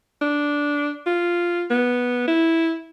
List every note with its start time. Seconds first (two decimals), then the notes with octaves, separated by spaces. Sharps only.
0.21 D4
1.06 F4
1.70 B3
2.28 E4